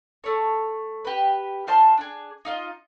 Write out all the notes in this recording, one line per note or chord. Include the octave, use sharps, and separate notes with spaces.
A3 C#5
G4 B4
F4 C5 A5 C6
D4 G#4
D#4 F4 D#5